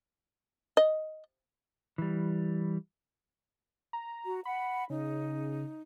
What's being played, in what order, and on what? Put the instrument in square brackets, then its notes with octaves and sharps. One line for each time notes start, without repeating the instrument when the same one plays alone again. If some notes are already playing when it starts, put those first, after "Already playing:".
[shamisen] D#5
[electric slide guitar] E3 G3
[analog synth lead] A#5
[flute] F#4
[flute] F#5 [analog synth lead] B5
[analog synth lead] C#3 [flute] D#4